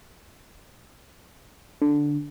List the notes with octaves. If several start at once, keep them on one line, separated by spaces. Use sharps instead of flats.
D3